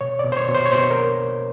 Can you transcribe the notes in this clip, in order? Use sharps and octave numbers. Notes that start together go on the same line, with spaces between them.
B2 C#5
D5
B2
C5
C#5
B2
C5
C#5
B2 C5
A#4